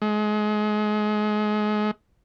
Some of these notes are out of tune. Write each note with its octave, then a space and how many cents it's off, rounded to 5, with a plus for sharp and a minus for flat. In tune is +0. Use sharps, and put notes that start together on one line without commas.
G#3 +30